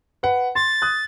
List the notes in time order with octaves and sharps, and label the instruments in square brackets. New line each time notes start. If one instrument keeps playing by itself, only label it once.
[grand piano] B4 F#5
[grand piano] C6 [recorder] A6
[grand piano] D#6 F#6